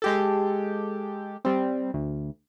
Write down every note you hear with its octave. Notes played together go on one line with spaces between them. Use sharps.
G#3 G4 A4
G3 C4
D2